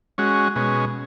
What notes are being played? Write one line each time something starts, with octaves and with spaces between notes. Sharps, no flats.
G#3 C#4 F#4
B2 G#3 C#4